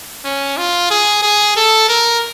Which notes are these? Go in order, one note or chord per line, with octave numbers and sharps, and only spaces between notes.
C#4
F4
G#4
G#4
A4
A#4